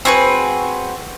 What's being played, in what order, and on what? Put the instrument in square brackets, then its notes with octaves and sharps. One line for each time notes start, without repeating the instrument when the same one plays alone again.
[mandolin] C4 F#4 G#4 B4